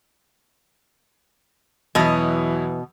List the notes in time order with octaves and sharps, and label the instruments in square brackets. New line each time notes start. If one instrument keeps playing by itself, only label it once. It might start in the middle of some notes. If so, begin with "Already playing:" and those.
[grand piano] E2 F#3 E4 [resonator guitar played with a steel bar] B2 D#5 [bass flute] E3